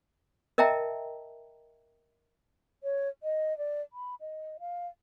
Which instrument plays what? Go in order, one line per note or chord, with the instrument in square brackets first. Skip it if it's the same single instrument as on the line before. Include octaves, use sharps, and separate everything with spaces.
[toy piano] A#4 D#5 E5 G5 A5 A#5
[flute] C#5
D#5
D5
B5
D#5
F5